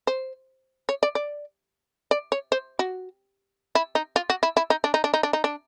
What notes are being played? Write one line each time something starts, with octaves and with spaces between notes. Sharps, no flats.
C5
C#5
D5
D5
D5
C#5
C5
F#4
E4
D#4
F4
F#4
E4
E4
D#4
D4
D#4
D4
D#4
D4
D#4
D4